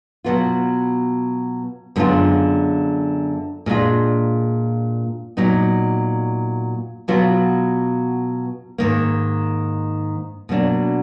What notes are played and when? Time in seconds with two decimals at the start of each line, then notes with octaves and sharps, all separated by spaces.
0.24 B2 F#3 B3 F4
1.96 F#2 D3 G#3 B3 F4
3.66 A#2 G#3 D4 F4
5.37 A#2 F#3 B3 D#4
7.08 B2 F#3 B3 F4
8.78 G#2 D#3 A#3
10.49 B2 F#3 A#3 D4